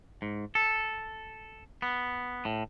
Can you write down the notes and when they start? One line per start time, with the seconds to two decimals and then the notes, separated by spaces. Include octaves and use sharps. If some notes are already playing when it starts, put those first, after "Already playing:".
0.22 G#2
0.55 A4
1.82 B3
2.45 A2